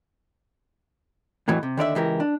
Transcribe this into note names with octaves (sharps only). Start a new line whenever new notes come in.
F2 A2 E3 F#3
C3
D#2 D3 D5 E5
C#2 E3 G4 A#4
D4